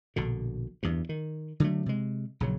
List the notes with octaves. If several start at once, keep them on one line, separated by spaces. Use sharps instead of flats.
A#1 B2 D3
E2 G2
D#3
D3 F#3 A3
C3 G#3
A#1 C#3 F#3